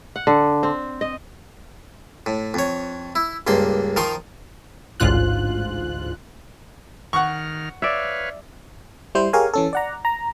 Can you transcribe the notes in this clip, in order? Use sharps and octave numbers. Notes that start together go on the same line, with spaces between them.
F#5
D3
C4
D#5
A2
F2 C#5
E4
C#2 G2 A#3 C6
D#3 F3 A#4 C6 C#6
A1 D2 G#2 F4 F#6
D#3 F#5 C#6 F6
B4 C#5 D5 E5 F5
G3 E4 C5
G4 G#4 A#4 C#5 F5 G#5
E3 C#4 A4
D5 F#5 A#5
A#5